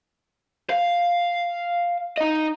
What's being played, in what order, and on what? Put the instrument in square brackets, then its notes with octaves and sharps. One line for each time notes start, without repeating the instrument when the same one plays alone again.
[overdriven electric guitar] F5
D#4 D#5